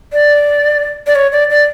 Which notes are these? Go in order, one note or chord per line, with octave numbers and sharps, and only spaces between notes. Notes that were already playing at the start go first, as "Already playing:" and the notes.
D5
D5
C#5
D5
D5